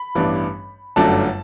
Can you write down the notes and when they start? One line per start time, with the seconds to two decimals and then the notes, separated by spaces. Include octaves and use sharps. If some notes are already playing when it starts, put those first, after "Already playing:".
Already playing: B5
0.15 A1 G2 E3 B3 D4
0.96 G1 F#2 F#3 A3 D4 A5